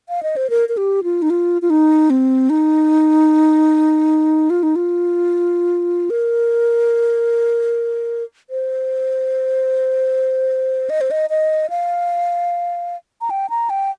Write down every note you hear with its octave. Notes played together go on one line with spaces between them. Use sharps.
F5
D#5
C5
A#4
A#4
G4
F4
D#4
F4
F4
D#4
C4
D#4
F4
D#4
F4
A#4
C5
D#5
C5
D#5
D#5
F5
A#5
G5
A#5
G5